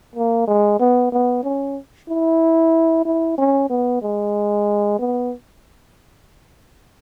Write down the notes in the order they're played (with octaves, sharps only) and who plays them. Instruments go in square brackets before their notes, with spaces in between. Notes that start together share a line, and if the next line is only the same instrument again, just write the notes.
[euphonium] A#3
G#3
B3
B3
C#4
E4
E4
C#4
B3
G#3
B3